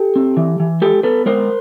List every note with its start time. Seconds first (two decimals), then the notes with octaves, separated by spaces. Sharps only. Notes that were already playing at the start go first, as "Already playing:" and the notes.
Already playing: G4 A4
0.16 C4
0.37 E3
0.60 E3
0.81 G#3 G4 A4
1.03 B3 A4 B4
1.26 G#3 A#4 C5